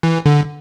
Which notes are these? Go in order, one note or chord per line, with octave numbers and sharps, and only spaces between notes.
E3
D3